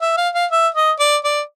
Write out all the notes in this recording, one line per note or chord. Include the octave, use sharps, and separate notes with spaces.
E5
F5
F5
E5
D#5
D5
D5